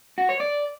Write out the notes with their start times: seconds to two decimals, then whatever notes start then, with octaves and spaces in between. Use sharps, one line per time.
0.18 F#4
0.29 C#5
0.40 D5